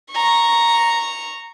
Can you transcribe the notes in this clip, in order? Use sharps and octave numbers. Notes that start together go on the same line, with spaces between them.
A#5 C#6